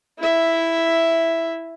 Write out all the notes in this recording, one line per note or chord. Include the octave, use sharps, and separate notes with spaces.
E4 E5